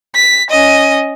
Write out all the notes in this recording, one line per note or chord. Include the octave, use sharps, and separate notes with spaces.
B6
C#4 D#5